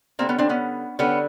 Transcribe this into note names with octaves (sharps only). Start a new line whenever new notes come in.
D3 G3 A#3 C4
B3 C#4
C4 D4
B3 C#4
D3 G3 B3 C#4